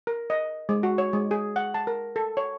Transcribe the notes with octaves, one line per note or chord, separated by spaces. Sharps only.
A#4
D#5
G#3
F#4
C#5
G#3
G#4
F#5
A5
A#4
A4
C#5